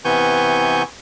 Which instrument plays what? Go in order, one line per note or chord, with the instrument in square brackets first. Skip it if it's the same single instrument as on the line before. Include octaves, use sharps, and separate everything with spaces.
[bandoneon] C3 E3 B3 G#5 C#6 G6